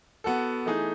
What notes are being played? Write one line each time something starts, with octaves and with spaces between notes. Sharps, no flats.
B3 F#4 A4
E3 A3 D#4 G#4